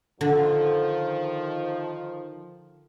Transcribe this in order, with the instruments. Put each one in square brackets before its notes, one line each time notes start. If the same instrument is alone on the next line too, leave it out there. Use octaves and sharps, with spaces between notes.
[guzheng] D3 [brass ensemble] D#3 F3